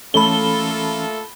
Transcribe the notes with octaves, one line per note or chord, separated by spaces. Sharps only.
E3 A3 A#3 C#4 F4 A4 B5 G7